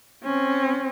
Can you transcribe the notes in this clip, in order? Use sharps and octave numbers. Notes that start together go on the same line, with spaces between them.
C4 C#4